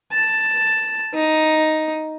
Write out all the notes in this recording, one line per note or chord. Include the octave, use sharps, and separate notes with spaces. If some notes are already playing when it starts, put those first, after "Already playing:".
A5
D#4